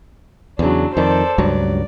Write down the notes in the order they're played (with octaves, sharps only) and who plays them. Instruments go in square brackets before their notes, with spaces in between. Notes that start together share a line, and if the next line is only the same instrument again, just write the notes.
[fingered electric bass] E2 C#3 [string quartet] F#3 D4
[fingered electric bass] F2 D#3 [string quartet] A4 C5 D5
[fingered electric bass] C#2 G2 F#3 [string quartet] D5